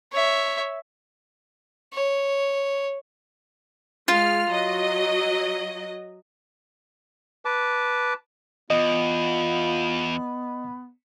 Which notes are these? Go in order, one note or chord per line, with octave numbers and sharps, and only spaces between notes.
C#5 E5
C#5
G#3 F4 F6
F#3 D#5
B4 A5 D6
E2 B3 F4 D#5